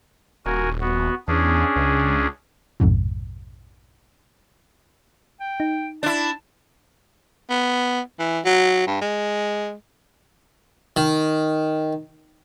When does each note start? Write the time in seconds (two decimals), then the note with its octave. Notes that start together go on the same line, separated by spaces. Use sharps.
0.46 D#1 F#4 A#4 G#5
0.81 B3 F#4
1.28 E2 C#4 D4 G#4
1.76 C#2
2.80 A#1 F2 G#2 B2
5.40 G5
5.60 D#4
6.03 D4 E4 A5
7.50 B3
8.19 E3
8.45 F#3
8.87 G2
9.02 G#3
10.96 D#3